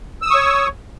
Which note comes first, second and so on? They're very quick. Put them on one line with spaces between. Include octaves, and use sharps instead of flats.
E6 D#6 C#6 C#5